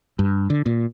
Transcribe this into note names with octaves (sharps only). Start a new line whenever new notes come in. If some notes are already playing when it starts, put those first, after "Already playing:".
G2
D3
A#2